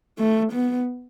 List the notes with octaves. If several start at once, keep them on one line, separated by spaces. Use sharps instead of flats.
A3
B3